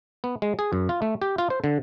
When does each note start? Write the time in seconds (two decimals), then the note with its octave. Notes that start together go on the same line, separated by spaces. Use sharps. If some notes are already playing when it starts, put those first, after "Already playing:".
0.24 B3
0.42 G#3
0.59 G#4
0.73 F#2
0.89 F4
1.02 A3
1.22 G4
1.38 F4
1.50 C5
1.64 D3